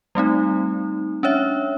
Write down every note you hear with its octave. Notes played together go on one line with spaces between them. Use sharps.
G3 A3 C4 D#4
C#4 D4 C#5 E5